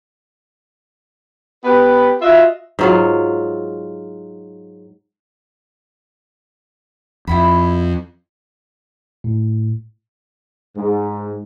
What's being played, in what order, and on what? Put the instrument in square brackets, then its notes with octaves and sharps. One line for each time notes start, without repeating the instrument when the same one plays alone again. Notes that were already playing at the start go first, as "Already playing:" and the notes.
[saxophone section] B3 G4 B4
F4 F#4 D#5 E5
[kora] G#2 F#3 F4
[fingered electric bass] F2 [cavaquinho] E4 F#4 B5
[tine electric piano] A2
[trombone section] G#2